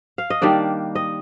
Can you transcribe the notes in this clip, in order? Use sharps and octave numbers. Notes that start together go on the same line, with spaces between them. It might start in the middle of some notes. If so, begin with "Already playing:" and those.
F5
D#5
D#3 G3 A#3 D4 D5
D#5